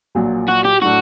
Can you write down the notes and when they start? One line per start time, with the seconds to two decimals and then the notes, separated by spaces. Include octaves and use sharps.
0.15 A#1 A#2 F#3
0.48 F#4
0.65 G4
0.82 A2 F#3 A3 D4 F#4